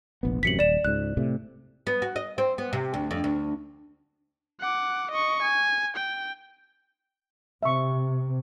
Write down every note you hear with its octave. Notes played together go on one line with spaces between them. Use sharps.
F1 A#1 B3
A1 F#2 C3 B6 C#7 F#7
D#1 D5 E7
C#2 G#2 F#6
A2 C3 A3
B3
F#4
D#5
C4
B3
C3
D2
F2
D2
F#5 D6
D#5 C#6
G#5
G5
C3 E5 C#6